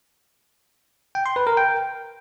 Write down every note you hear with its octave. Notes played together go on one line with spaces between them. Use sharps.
G5
C6
B4
A#4
G5